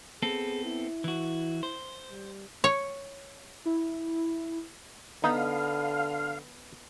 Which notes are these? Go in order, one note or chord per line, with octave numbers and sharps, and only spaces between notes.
B3 C4 G#4 A4
E4
E3 F#4
C5
G3
C#5
E4
D3 B3 D#4 D#5 F5 B5